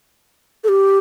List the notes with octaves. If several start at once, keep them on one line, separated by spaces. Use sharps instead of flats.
A4
G4